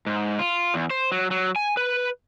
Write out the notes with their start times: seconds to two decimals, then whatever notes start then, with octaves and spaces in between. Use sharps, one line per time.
0.07 G#2
0.39 F4
0.74 E2
0.90 C5
1.12 F#3
1.31 F#3
1.56 G#5
1.77 B4